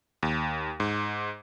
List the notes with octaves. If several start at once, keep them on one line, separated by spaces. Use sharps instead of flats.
D#2
G#2